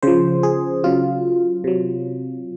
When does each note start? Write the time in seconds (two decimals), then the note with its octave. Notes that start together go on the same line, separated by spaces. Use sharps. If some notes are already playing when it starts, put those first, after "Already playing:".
0.03 C#3 F3 C5
0.43 G#4
0.84 C#3 F#3 F4
1.64 C3 F#3